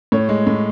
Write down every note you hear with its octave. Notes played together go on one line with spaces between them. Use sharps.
A2 C#5
G#3
A2